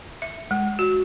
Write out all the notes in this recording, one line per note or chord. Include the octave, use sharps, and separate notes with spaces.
E5
G#3
F#4